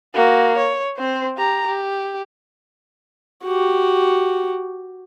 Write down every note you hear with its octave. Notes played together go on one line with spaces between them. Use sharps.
A#3 F#4
C#5
C4 C5
G4 A#5
G4
F#4 G4